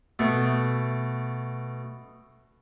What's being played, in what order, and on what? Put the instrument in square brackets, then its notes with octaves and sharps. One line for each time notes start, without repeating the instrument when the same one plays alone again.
[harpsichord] B2 A3